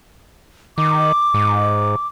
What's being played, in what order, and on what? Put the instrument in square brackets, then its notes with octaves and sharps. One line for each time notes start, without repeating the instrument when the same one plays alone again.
[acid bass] D#3 [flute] D6
[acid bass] G#2